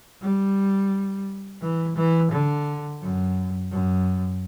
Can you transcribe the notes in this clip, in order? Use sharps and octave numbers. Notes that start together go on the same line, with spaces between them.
G3
E3
E3
D3
F#2
F#2